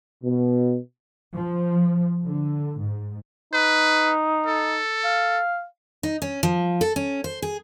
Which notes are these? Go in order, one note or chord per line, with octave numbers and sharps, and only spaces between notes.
B2
F3
D3
G#2
D#4 B4
A4
F5
D#4
C#4
F3
A4
C#4
C5
G#4